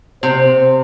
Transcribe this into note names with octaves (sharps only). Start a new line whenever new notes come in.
C3 C5